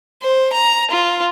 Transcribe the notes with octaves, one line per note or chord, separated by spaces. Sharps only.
C5
A#5
F4